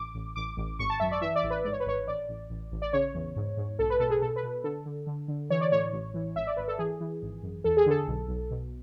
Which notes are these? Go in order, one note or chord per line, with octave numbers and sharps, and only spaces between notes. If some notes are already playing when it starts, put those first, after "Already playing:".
Already playing: A1 D6
A1
A1 D6
A1
G#1 C#6
A5
F#2 E5
D5
E3 E5
D5
A1
B4
G#2 D5
C#5
B4
G#1 C#5
A1 D5
A1
A1
A1
D5
C#3 C#5
E2
G#2
G#2
B1 A4
B4
B2 A4
G#4
B2 A4
B4
B2
D3 A4
D3
D3
D3
E3 C#5
D5
A2 C#5
A1
E3
G#1 E5
D5
G#1 B4
A4
E3 G#4
E3
G#1
F#2
E2 A4
G#4
D3 A4
B1
B1
B2